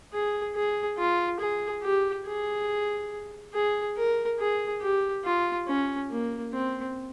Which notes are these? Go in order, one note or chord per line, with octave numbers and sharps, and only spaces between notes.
G#4
G#4
F4
G#4
G4
G#4
G#4
A#4
G#4
G4
F4
C#4
A#3
C4